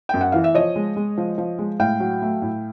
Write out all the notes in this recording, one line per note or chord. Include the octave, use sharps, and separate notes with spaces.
F#2 G5
F#5
E3 F5
E5
F3 C#5 D#5
G#3
G#3
F3
F3
G#3
A2 F5 G5
F#3
A3
A2